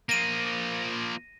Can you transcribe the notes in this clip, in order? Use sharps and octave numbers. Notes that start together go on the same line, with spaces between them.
F3 A#3 A#6 D#7